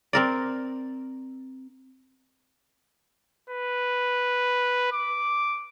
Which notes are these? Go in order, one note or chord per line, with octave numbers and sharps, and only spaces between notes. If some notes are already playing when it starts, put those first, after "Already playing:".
C4 A#4 D5
B4
D6